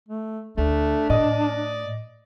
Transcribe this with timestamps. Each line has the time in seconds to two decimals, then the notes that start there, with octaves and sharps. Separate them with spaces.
0.09 A3
0.58 D2 A3 D4
1.10 A2 D5 D#5